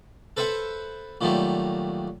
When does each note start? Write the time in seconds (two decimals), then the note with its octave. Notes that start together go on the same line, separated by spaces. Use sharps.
0.37 A4 B4 C5 E5 F#5
1.21 A#2 D#3 F#3 G3 A3